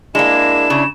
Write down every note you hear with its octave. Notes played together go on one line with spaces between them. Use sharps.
G#3 A#3 D4 E4 E7
C#3